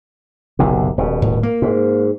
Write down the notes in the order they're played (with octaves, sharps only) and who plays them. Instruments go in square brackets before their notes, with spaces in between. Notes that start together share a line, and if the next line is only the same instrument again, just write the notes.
[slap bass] F#1 B1 C3
D#1 B2
[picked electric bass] A2
A#3
[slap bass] G#2